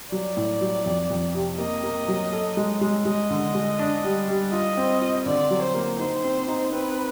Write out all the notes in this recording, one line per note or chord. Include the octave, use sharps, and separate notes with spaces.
F#3 D5
A2
F#3
F2
F2
C3
A#3 D#5
A#3
F#3
A4
G#3
G#3
G#3 D#5
D3
G#3
D4
G3
G3
F4 D#5
C4
F4
D3 D5
F#3
C5
A#3
D#4 C5
C4
D#4
C4 B4